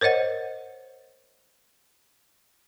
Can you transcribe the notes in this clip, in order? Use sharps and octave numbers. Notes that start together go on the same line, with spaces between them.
A#4 C5 C#5 D#5 F#5